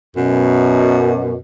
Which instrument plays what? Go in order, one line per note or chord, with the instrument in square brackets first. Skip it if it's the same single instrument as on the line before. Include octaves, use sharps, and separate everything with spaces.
[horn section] F#2 B2